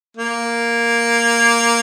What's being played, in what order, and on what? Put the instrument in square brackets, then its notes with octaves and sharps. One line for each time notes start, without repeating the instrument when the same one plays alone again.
[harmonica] A#3